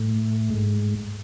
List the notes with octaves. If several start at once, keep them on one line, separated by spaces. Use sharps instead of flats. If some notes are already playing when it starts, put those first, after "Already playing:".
Already playing: A2
G#2